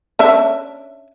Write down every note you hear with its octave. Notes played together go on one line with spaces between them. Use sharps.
C#4 D4 E5